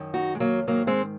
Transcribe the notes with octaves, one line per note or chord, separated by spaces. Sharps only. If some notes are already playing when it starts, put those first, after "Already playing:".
Already playing: F#2 D#3
D#4 F#4
G#3
F#3 A#3
G#2 D#3 F#3 A#3
G#3 C4